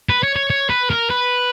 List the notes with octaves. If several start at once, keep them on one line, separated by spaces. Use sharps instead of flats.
B4
C#5
C#5
C#5
B4
A#4
B4